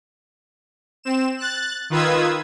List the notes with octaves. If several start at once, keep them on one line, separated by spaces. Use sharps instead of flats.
C4 E7
F#6 A6
D#3 F4 B4 D#6 E6 G#6